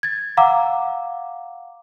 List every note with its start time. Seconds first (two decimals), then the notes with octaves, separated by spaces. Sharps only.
0.03 G#6 A6
0.37 F5 F#5 A#5 D6 E6